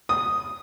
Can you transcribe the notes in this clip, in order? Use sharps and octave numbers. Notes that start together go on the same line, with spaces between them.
D#6